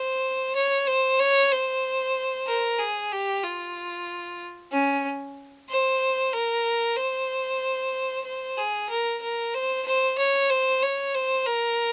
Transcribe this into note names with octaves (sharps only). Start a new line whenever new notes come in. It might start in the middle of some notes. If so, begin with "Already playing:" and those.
Already playing: C5
C#5
C5
C#5
C5
A#4
G#4
G4
F4
C#4
C5
A#4
C5
C5
G#4
A#4
A#4
C5
C5
C#5
C5
C#5
C5
A#4